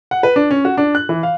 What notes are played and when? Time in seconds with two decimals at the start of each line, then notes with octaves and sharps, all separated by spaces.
0.11 F#5
0.23 B4
0.36 D4
0.51 C#4
0.65 F#4
0.77 D4
0.95 F#6
1.09 E3
1.23 F5